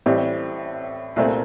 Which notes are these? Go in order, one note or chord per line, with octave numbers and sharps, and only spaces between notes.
A1 A2 G3 C4 G4
C2 A#2 A3 C4